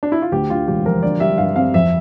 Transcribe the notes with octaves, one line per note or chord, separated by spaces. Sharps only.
D4
E4
F4
D2 G4
D3 F4
E1 G4
F3 A#4
D3 D5
G3 E5
G2 F5
C4 F5
F2 E5